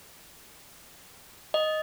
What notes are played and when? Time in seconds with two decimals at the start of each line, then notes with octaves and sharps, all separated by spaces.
1.54 D#5